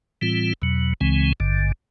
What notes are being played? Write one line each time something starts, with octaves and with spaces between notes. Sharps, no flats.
A2 E3 G3 C4 F4
E2 B2 F#3
C#2 C#3 E3 G#3 C4
G#1 G2 D3